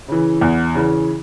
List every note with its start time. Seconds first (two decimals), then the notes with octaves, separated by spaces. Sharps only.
0.08 C#3 E3
0.41 E2
0.75 C#3 E3